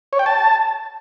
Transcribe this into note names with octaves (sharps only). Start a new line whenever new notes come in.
C#5
G5
A5